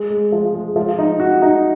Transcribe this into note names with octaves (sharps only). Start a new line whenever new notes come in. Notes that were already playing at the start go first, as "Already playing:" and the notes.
Already playing: G#3
G#3
F3
G#3
F3
D#4
F#4
D#4